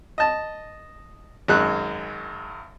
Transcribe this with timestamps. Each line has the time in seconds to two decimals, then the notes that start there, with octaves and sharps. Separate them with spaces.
0.18 D#5 A5
1.48 G#1 F#2 G#3 F#6